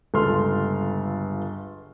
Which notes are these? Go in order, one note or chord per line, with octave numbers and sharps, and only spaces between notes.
G1 C#2 A4 C6 F6